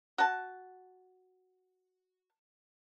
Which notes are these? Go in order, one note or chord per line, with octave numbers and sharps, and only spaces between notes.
F#4 A5